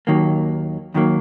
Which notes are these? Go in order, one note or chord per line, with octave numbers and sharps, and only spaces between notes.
D#2 D#3 F#3 A#3
D#2 D#3 F#3 A#3